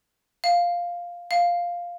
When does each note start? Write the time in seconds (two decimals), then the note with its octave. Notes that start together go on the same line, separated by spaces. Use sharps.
0.44 F5
1.31 F5